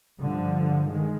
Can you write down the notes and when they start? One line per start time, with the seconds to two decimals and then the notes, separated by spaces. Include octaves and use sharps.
0.20 G2 D3 F3
0.89 D#3 G#3